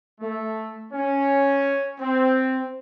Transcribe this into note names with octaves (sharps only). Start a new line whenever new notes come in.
A3
C#4
C4